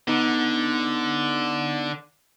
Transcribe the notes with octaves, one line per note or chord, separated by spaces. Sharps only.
D3 B3 D#4